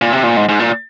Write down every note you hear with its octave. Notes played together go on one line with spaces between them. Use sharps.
A#2
C3
A#2
G#2
G#2
A#2